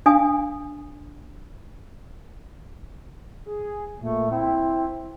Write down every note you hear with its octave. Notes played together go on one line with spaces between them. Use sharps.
D4 F5 G#5 D#6
G#4
A#2 A3
C4 E4